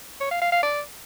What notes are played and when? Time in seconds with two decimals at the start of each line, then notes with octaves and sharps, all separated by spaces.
0.21 C#5
0.31 F5
0.42 F5
0.52 F5
0.63 D5